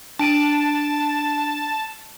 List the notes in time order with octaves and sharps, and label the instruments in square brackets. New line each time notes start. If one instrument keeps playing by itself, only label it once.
[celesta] D4 D7 D#7 [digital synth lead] A5